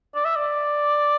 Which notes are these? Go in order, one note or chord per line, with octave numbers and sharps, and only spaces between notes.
D5
E5
D5